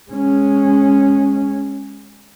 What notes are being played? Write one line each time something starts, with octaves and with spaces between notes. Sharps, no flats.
G#3 C#4